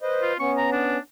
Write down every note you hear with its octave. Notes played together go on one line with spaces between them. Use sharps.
B4 C5 D#5
F4
B3 C#4 C#6
A#5
D4